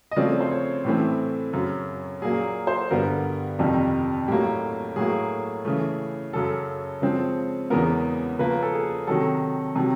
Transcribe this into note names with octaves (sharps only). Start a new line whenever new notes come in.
D#5
C#3 F3 A3 C4 D5
C5
C#5
A2 E3 A3 C4
F#2 C#3 F#3
A#2 F#3 A#3 G#4
C5
G2 D3 G3 B3 A#4
F2 C3 D#3 G3
A2 F#3 A#3 G4
A2 F#3 A#3 G#4
C#3 E3 A3
F#2 C#3 F#3 A4
C#3 F3 G#3 C4
E2 C#3 E3 G#3 B3 A#4
C#3 F3 A#3 B4
A4
G#4
C3 D#3 F#3 A4
C3 D#3 F#3